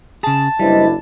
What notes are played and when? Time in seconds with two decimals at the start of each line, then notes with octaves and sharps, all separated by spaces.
0.23 C#3 G#4 A5
0.59 F#1 G3 D4 E4 B4 C5 D#5